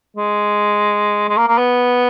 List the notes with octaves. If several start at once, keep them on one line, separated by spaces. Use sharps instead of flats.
G#3
G#3
A#3
A#3
B3